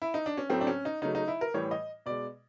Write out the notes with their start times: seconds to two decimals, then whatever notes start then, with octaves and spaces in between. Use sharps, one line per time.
0.02 E4
0.14 D#4
0.26 D4
0.37 C#4
0.50 A2 F#3 A3 C4
0.61 D4
0.67 C#4
0.85 D#4
1.02 C#3 F#3 A3 D#4
1.15 D#4
1.28 E4
1.41 A#4
1.54 A2 E3 G3 C#5
1.71 D#5
2.06 B2 G#3 D5